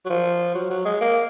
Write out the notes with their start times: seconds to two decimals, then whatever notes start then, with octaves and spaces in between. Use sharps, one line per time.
0.05 F#3
0.10 F3
0.54 F#3
0.70 F#3
0.85 G#3
1.01 A#3